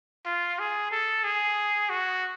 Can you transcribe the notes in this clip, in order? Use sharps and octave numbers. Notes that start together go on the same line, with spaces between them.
F4
G#4
A4
G#4
F#4